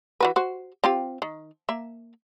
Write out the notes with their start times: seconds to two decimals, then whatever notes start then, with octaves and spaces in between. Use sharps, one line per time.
0.20 E3 F#4 B4
0.36 F#4 C5
0.84 C4 F4 G4
1.22 D#3
1.69 A#3 E5